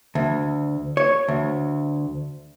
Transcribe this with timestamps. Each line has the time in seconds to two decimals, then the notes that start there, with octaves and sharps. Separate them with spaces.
0.15 D2
0.97 C#5
1.28 D2